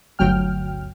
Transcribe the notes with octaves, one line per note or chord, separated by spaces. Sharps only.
G1 D2 F#3 G5 F6